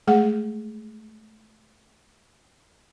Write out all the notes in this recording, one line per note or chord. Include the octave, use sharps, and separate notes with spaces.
G#3 A3 G#4 F#5